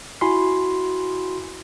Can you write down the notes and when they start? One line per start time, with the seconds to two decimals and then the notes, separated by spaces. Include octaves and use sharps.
0.21 E4 F#4 G#5 B5 C6